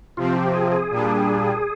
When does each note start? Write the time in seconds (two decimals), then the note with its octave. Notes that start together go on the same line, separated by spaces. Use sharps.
0.17 C3 F3 C4 F4
0.36 G4
0.53 G#4
0.72 G#4
0.91 A#2 G3 D4